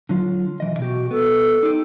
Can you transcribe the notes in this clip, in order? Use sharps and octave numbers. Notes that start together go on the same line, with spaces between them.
D3 F#3 F4
B1 E3 D#5
B2 F#4 G4
B3 A4
D#4 G4